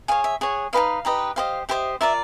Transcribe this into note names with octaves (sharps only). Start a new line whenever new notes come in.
G#4 C#5 F5
E5
G#4 C#5 F#5
D#4 G4 B4 D#5 F5
D#4 G4 B4 D#5
G4 C5 D#5 F5
G4 C5 D#5 E5
F4 A#4 D5 E5